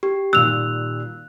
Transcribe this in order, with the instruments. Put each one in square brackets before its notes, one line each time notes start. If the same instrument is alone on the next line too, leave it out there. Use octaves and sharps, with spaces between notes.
[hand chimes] G4
[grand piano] A#2 D#3 G3 [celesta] E6 F7 [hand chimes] F#6